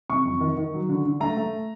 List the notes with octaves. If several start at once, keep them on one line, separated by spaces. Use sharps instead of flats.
C3 C#6
F2
D#3
D#3
F#3
D3
D3
A3 A#5
A3